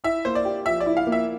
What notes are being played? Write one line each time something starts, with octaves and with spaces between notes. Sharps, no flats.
E4 E5
A#3 C5
D5
G4
F3 E5
D5
E4
F5
A#3
E5